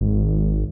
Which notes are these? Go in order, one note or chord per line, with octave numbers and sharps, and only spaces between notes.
G#1